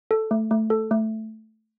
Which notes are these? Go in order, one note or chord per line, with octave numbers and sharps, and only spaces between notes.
A4
A3
A3
A4
A3